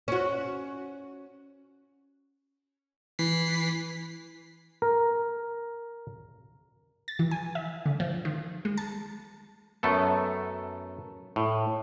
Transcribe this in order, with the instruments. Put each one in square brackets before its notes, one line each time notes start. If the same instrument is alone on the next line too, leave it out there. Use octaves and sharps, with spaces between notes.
[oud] C#4 F#4
[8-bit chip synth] E3 B6 C7
[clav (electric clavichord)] A#4
[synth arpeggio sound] A6
E3
G#5
E5
D3
F3
D#3
G#3
A5
[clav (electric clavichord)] F#2 A3 B3 A4
A2